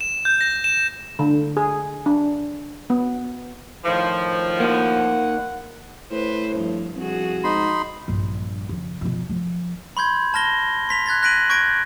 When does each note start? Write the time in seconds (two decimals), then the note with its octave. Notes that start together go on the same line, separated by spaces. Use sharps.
0.01 E7
0.25 G6
0.41 A#6
0.64 E7
1.19 D3
1.57 G#4
2.06 D4
2.90 B3
3.85 A2 D#3 F3
4.60 A#3 D#4 F#5
6.11 A2 B4 C5
6.55 G2 F3
6.96 C2 F3 F#4 G#4
7.44 G#2 D#4 B5 C6
8.08 A#1 G2
8.69 F2 C#3
9.01 F2 B2
9.29 F3
9.97 B5 C6 G6 G#6
10.34 A5 F6 A#6 G7
10.89 C6 B6 F7
11.06 F#6 G#6 A6 B6
11.23 F#6 A#6 B6 D7 D#7 F#7
11.50 C#6 G6 G#6 A#6 D7